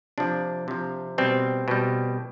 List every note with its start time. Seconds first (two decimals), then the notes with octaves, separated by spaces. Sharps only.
0.18 C3 F3 D4
0.68 C3 F3
1.18 B2 G3 C4
1.68 B2 G3